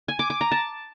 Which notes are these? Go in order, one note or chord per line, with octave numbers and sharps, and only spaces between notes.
G#5
D6
D6
A#5
A5